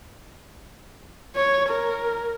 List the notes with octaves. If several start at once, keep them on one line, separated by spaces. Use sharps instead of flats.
C#5
A#4